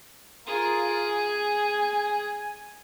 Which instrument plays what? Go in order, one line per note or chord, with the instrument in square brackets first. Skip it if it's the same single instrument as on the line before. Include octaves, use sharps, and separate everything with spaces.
[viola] F4 A#4 [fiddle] G#4
[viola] G#5